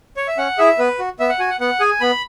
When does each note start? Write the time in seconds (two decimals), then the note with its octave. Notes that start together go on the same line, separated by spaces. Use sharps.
0.17 C#5
0.28 E5
0.38 C#4 F#5
0.58 E4 G#4 E5
0.79 B3 B4
0.99 F#4
1.20 B3 E5
1.29 F#5
1.39 F#4 G#5
1.50 F#5
1.60 B3 F#5
1.80 G#4 G#5
2.01 B3 B5